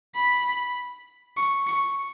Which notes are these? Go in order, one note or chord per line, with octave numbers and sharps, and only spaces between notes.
B5
C#6
C#6